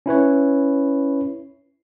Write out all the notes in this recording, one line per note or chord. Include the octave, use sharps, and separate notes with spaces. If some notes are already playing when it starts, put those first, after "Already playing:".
C#4 E4 B4 C#5